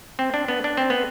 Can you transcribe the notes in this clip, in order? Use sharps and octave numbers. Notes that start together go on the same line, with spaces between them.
C4
D4
B3
D4
C4
B3